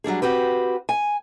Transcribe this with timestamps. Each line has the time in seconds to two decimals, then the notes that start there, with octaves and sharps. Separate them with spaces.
0.04 F#3 G3 D4 G#4
0.22 C4 F#4 G4 B4
0.89 G#5